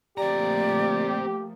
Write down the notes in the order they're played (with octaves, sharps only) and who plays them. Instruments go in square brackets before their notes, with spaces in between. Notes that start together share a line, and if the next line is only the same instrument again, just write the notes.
[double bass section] F3 A3 A#3 [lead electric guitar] C4 A#5 [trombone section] G4 [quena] D5